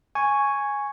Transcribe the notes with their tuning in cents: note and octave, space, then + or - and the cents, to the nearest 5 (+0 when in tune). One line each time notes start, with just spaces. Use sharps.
G#5 +0 C#6 +0